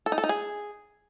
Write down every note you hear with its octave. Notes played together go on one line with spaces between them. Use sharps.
A4
D#4
A4
D#4
G#4